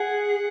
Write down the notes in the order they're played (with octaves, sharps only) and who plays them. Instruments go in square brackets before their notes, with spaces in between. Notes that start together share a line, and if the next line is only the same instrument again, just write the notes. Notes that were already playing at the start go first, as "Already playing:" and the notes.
Already playing: [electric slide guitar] G#4 [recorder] F#5